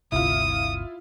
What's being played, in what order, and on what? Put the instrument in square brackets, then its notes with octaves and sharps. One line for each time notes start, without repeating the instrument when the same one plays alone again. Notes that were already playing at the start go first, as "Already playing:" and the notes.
[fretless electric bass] G1 D2 C3 [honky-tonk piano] E4 F4 [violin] D#6